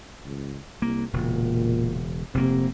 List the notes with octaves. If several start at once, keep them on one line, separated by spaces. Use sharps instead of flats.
C#2
C2 A#3
E1 A#2 C#3
F1 C3 A#3